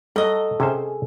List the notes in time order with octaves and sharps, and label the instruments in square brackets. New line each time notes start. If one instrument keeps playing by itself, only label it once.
[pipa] F#3 D#5 [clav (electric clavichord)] G3 [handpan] A4
[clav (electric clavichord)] C3 C#4 C5 [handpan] G#4